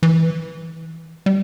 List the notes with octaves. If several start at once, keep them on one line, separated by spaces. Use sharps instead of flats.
E3
G3